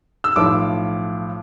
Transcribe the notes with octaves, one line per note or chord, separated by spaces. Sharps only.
E6
B1 A2 F3 D6